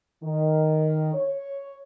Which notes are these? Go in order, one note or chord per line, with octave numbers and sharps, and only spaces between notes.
D#3
C#5